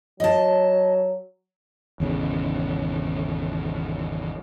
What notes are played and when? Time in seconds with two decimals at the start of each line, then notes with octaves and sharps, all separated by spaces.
0.20 F#3 D#5 A5
2.00 G#1 E2 C#3